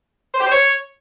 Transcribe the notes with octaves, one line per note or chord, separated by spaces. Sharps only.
C5
G4
C5
C#5